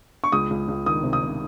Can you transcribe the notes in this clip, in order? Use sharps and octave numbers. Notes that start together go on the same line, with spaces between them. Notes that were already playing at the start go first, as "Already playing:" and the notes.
C#6
C#2 D#6
C#2
C#2
D#3 D#6
C3
D#6
C3